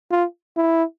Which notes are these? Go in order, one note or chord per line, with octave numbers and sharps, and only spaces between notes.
F4
E4